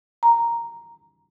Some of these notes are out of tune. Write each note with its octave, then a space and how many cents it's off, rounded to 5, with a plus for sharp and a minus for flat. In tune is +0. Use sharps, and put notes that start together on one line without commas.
A#5 +0